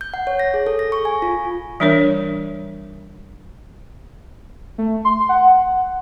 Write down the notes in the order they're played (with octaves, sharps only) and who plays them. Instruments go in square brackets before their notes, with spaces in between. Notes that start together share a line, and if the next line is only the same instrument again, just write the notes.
[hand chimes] G6
F#5
C#5
A#6
G#4
A4
A#6
C#6
G#5
F4
[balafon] E3 G3 D4 A#4 C#5
[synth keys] A3
C6
F#5